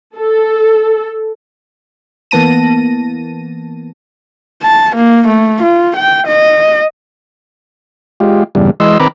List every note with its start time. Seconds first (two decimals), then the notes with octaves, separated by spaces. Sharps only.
0.17 A4
2.31 E3 A#3 B3 A5 A#6 D#7
4.62 A5
4.96 A#3
5.27 A3
5.62 F4
5.96 G5
6.27 D#5
8.20 G#3 F4 G4
8.55 E2 G2 C#3 G3
8.80 E3 G#3 D#5 C6 E6
9.00 D#3 C4 B4 A#5 B5 D6